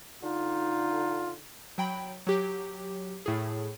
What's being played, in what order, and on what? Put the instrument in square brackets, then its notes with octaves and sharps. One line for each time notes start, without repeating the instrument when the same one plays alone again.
[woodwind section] D3 D#4 [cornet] F4
[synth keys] F#3 G5 B5
F#3 G4
A2 G#4